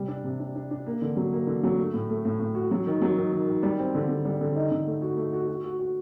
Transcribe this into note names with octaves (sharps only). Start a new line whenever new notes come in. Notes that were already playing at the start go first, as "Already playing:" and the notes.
Already playing: C3 G3
D4
C3
D4
D4
D4
A#3
D3
F#3
A#3
D3
F#3
A3
A2
A3
A2
A2
F#4
F#3
D#3
F#3
D#3
D#3
D#3
G3
C4
D3
D3
G3
D3
D#4
D3
A3
F#4
A3
F#4
F#4
F#4
F#4